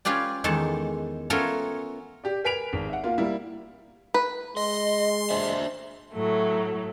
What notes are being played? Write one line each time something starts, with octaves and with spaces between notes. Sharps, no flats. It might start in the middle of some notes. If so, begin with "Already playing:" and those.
C#4 F4 G4 B4 D5
E2 D#3 G#3 A4 A5
A3 B3 C#4 F4 A4 A#4
G4 D5
A#4 B4 G#5 B6 D7 F7
G#1
E5 F#5
A#3 F4
G3 A#3 E4
B4
G#3 D#5 C6
D4 C5 E5
A2 F#3 A3